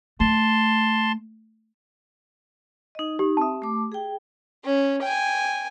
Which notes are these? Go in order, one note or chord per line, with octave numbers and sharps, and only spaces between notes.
A3 A5 C6
D#4 D#5
D#4 G4
C4 E5 A5 D#6
A3 D6
G#4 G5
C#4
G5 G#5